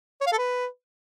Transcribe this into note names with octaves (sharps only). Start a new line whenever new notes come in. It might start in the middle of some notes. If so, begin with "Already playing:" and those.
C#5
F5
A4
B4